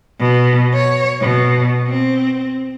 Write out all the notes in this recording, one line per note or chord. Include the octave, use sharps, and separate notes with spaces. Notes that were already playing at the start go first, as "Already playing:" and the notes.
B2
C#5
B2
C4